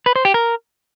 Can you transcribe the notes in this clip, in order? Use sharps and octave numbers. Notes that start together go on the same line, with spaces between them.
B4
C5
G4
A#4